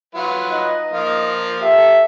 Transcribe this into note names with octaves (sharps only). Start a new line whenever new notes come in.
F#3 F4 B4
D#4 D#5
F3 A#3 F4
G4 A4 E5